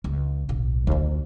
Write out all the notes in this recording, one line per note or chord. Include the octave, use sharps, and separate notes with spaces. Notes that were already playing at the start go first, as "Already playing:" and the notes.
C#2
D1 B1
D2 F4